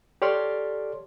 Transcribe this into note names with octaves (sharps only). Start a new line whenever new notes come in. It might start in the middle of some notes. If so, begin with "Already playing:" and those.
G4 A4 C#5 D5 C6 F6